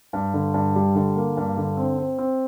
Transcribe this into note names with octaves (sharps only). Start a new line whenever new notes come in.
G2
D3
G2
G3
D3
A#3
G2
D3
C4
C4
C4